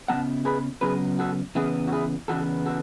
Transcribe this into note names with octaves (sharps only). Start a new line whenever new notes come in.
C#3 F#3 B3 F#5 A5
G#4 B4
C#3 F#3 B3 G#4 B4
F#4 A4
E2 C#3 E3 B3 E4 G#4
F#4
E4 G#4
E2 C#3 E3 B3 F#4 A4
F#4 A4